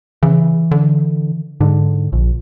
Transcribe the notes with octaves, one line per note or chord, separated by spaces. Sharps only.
C#3 E3
D3
G#2 D3
A#1